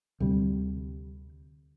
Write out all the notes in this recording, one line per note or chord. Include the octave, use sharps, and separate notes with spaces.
D2 C3 G3